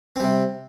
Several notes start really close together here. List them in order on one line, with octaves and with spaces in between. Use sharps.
C4 G3 C3